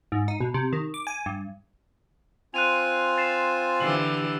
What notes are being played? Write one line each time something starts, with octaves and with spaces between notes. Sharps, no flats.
G#2
D#4
B2
C3
D#3
D6
G#5
G2
C4 F4 G#5 F#6 D#7 F7
A6 C7 E7
D3 E3 G4 E6 C7 F#7